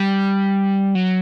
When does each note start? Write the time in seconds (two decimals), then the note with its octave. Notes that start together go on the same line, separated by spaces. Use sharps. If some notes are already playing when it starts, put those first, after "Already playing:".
Already playing: G3
0.95 F#3